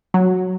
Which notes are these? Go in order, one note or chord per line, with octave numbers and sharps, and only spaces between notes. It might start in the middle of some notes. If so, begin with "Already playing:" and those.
F#3